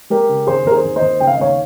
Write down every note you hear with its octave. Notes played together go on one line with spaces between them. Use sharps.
G#3 G4 A#4
C#3
D#2 G#4 C5
D#2 A#4
G#4 C5
D#2
C5 D#5
D#2
C#3 G5
F5
D#5
D#2 C#5 F5